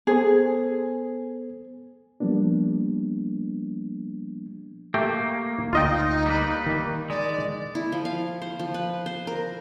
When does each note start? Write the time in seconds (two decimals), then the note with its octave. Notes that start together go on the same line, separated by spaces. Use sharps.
0.07 B3 G#4 A4 C5
2.20 F3 G3 A#3 B3 D4
4.94 A3 A#3 G4 G5
5.73 D2 D#4 F4 D#5 G5
6.26 G3 A#3 B4
6.66 D#3
7.10 G#3 D5
7.75 E4
7.92 F3
8.05 F5
8.42 C5
8.59 F3
8.74 B4
9.06 C5
9.27 A#4